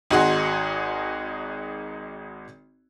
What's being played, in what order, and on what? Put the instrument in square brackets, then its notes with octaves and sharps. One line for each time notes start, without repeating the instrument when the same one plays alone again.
[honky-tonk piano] G#1 D#4 F#4 G#4 F#5 C6